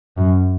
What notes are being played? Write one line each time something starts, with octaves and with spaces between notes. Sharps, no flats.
F#2